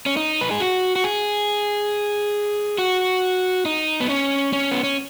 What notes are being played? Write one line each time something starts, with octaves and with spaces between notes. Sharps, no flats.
C#4
D#4
B4
G#4
F#4
F#4
G#4
F#4
D#4
B3
C#4
C#4
B3
C#4